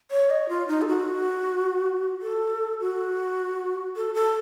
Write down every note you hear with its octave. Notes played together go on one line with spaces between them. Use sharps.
C#5
D#5
F4
D#4
A4
F#4
A4
F#4
A4
A4